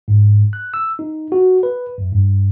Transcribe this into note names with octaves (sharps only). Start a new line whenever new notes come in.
G#2
F#6
E6
D#4
F#4
B4
F#2
G2